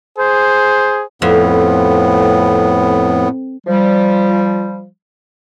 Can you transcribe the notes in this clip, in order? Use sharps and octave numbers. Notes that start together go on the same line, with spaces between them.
G#4 C5
F2 A2 B3
F3 G3